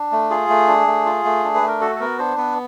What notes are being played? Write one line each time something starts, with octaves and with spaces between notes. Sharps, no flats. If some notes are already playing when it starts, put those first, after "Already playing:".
Already playing: D4
A3
F4 G#4
A3
D4
A3
F4
A3
D4
B4
A3
A#4
F#4 A4
A4
B3 A#4
D4 C5
B3 B4